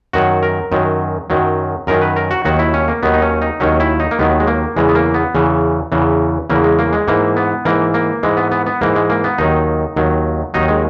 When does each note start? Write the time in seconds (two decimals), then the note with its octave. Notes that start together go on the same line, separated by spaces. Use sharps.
0.13 F#2 D#3 F#3 F#4
0.43 A#4
0.72 F#2 D#3 F#3
1.30 F#2 D#3 F#3
1.87 F#2 D#3 F#3 A#4
2.02 B4
2.16 A#4
2.31 F#4
2.45 D#2 D#3 F#3 F#4
2.59 E4
2.74 C#4
2.88 A#3
3.03 D#2 D#3 F#3 B3
3.14 D#4
3.22 C#4
3.42 D#4
3.60 D#2 D#3 F#3 C#4
3.80 E4
4.00 D#4
4.11 A#3
4.19 D#2 D#3 F#3 B3
4.40 G#3
4.47 A#3
4.76 E2 C#3 E3 G#3
4.89 B3
4.95 A#3
5.14 B3
5.35 E2 C#3 E3
5.92 E2 C#3 E3
6.50 E2 C#3 E3 A#3
6.64 G#3
6.79 A#3
6.93 G#3
7.08 G#2 E3 A#3
7.36 B3
7.65 G#2 E3 A#3
7.94 A#3
8.23 G#2 E3 G#3
8.37 B3
8.51 B3
8.66 B3
8.81 G#2 E3 A#3
8.96 G#3
9.10 A#3
9.24 B3
9.38 D#2 D#3 F#3 D#4
9.96 D#2 D#3 F#3
10.54 D#2 D#3 F#3 D#4
10.68 G#3